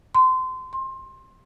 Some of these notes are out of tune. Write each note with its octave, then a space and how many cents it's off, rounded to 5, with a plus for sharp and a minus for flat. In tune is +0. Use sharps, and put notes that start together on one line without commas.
C6 -25
C6 +20